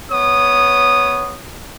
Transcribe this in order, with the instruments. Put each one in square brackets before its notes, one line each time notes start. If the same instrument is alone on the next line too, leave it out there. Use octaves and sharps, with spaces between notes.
[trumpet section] B3 C#5 D#6